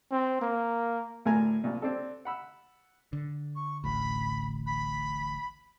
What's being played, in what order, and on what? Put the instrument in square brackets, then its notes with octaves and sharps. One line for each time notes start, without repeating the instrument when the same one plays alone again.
[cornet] C4
A#3
[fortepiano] D2 A2 A4 A#4 G#5 A#5
C2 A#2
C4 D4 A4
F#5 B5 E6
[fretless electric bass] D3
[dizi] C#6
[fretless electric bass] D1 A1 D2 [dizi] B5
[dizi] B5